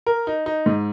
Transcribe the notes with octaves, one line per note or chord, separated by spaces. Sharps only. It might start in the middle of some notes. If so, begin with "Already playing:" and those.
A#4
D#4
D#4
G#2